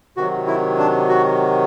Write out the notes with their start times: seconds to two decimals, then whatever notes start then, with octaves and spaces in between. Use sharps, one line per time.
0.17 C3 D#3 F#3 F#4
0.47 E4
0.78 D4
1.08 F#4